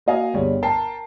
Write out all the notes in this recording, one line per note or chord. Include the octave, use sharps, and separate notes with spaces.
A#3 F#4 D#5 F5 G#5
G1 G3 G#4 C#5
A#4 G5 A5 C7